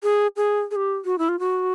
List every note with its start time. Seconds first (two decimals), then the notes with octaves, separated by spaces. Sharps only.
0.03 G#4
0.37 G#4
0.71 G#4
0.76 G4
1.05 F#4
1.19 E4
1.29 F4
1.39 F#4